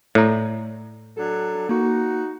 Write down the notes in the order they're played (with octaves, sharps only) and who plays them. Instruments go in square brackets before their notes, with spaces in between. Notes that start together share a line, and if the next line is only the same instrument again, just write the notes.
[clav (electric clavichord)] A2 [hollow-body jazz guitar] D5 A#5
[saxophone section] F#3 D4 A4
[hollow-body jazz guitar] A#3 [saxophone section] D#4 F#4